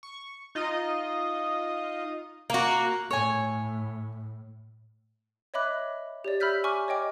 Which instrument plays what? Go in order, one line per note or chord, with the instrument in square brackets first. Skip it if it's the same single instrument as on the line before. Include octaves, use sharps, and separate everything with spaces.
[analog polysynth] C#6
D#4 F4 D#5
[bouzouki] A#3 F#4
[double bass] A2 [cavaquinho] C#5 G#5
[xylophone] C#5 D#5 E5 B5 D6 F#6
G4 C#5 D5
E5 B5 E6 F6 G6 B6
G#5 C#6 D6 F6
C#5 D#5 G5 D6